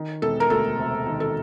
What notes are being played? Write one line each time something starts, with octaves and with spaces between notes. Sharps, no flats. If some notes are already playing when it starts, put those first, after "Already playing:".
Already playing: D#3
E1 A4
A#4
D2 A4
C3
D#3
A4